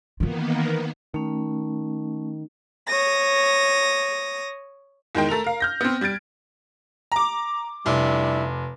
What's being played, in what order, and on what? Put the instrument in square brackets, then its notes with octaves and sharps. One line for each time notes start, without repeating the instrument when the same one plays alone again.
[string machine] D#3 A#3 B3 [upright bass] E3 F4
[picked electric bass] D#3 [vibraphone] A3 C#4
[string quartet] C#5 D#6 A#6
[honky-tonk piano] E2 D#3 G#3 G5
A3 A4 A#4 F7
A#4 F5
F6 G6 A#6
B3 C4
G3 G#6 A6 D7
A#5 D6
[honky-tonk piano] F1 [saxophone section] G3 D4 E4